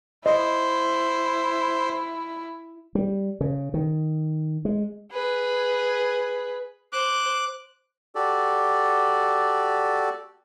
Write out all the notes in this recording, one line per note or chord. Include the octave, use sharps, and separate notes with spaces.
E4 C5 D#5
G3
C#3
D#3
G#3
G#4 B4
C5 D6 F#6
F#4 G4 A4 D5